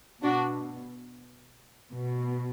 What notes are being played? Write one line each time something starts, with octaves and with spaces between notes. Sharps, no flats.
B2 D4 F#4
B2